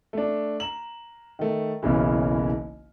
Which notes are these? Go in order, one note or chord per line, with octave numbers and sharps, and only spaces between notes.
A3 D4
A#5 E7 F#7
D#3 A3
F#1 B1 C#3 E3